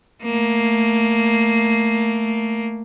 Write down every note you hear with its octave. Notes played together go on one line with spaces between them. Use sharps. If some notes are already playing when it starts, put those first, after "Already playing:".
A3 A#3